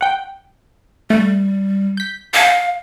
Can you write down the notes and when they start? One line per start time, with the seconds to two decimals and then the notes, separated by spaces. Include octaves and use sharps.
0.01 F#5 G5
1.10 G3 A3
1.97 G6 B6
2.34 F5 G#5 A5 G6